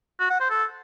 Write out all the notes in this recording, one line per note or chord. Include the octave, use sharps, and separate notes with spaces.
F#4
F#5
C5
A4